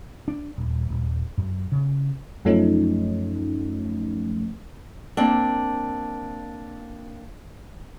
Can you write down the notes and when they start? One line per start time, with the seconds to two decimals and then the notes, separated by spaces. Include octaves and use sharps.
0.28 D4
0.58 D#1
0.89 D#1
1.38 F#2
1.72 C#3
2.45 F#2 F3 A3 C#4 D#4
5.17 A#3 C4 D4